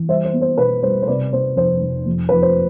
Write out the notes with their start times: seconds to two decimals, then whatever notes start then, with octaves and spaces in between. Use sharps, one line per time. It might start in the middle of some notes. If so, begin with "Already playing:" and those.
Already playing: E3
0.08 G3 C5 E5
0.25 C5
0.33 B3
0.41 C5
0.58 B2 B4
0.83 G3 C5
1.02 C5
1.07 C3 B4 D5
1.33 C3 C5
1.56 F1 C5
1.82 F1
2.06 F2
2.29 F3 B4
2.42 C5